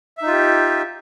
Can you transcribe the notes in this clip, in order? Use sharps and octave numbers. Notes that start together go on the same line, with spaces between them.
D#4 F4 G4 E5